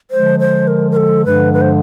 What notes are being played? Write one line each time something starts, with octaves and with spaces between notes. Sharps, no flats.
D3 F3 G#3 C5
C5
A#4
A#4
A4
G2 D3 F3 G#3 B4
B4
C5